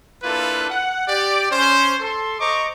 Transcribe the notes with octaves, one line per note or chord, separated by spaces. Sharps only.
A#3 D4 E4 F4 A4 B4
F#5
G4 D5
C#4 C5
A4 C6
C5 D#5 A#5 C#6 D6